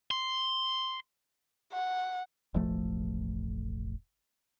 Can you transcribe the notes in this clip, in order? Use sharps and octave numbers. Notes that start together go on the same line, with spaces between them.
C6
F#5
E1 A1 F3 A3